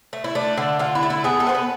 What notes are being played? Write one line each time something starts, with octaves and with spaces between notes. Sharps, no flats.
A3
E4
A3 D4
D3
D3 F4
E4
A3
E4
B3 G#4
A4
B3 C5
B4